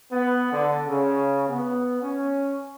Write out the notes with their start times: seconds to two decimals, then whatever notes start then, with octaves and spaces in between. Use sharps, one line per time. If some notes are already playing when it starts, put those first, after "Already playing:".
0.11 B3
0.52 D3
0.87 C#3
1.49 B3
2.02 C#4